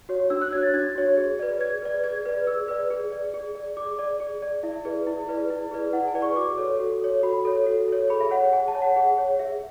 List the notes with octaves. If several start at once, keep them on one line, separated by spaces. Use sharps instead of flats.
F#4 C#5
D4 E6
F#6
F#4 C#5 G#6
A6
D4 G#6
F#4 C#5
G#4
B4 D5
G#4 G#6
B4 D5
G#4 G#6
B4 D5
G#4 E6
B4 D5
G#4
D5
G#4
D5
G#4 D6
D5
G#4
D5
E4 E5
G#4 B4 D5
E4
G#4 B4 D5
E4
G#4 B4 D5
E4 F#5
G#5
G#4 B4 D5
C#6
F#4 D6
A4 C#5
F#4
A4 C#5
F#4 B5
A4 C#5
F#4
A4 C#5
G#4 B5
E5
C#5 F#5
F#5
G#4 G#5
A5
C#5
F#5
G#4 F#5
C#5
G#4 E5